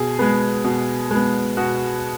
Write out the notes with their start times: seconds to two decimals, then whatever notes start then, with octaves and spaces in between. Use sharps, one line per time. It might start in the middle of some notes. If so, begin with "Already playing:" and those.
Already playing: B2 G#4
0.19 G#3 B3
0.64 B2
1.11 G#3 B3
1.57 B2 F#4